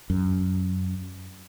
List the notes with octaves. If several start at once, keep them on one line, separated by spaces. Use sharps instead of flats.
F#2